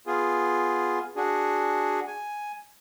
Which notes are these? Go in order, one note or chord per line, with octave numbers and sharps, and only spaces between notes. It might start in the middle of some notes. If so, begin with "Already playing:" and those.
B3 F4 G#4
D4 F#4 G#4
G#5